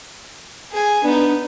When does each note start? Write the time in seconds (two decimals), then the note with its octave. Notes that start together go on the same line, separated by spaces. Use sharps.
0.72 G#4 G#5
1.03 B3 D4 D#4